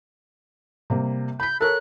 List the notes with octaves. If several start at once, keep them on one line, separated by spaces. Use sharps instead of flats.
C3 G3 A#3
B5 G6 B6
A4 A#4 C#5 F#6